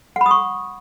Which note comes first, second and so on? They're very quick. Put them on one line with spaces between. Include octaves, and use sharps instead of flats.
F#5 B5 D#6 C#6